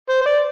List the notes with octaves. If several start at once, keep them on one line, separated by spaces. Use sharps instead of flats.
C5
C5
D5